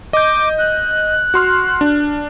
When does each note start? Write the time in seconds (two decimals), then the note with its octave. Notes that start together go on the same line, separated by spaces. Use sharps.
0.13 D#5 D6 G6
0.58 F#6
1.34 F#4 C6 F6
1.81 D4